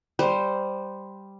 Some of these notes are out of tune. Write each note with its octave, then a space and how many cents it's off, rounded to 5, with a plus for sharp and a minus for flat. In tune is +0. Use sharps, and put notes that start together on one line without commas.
G3 +0 C5 -5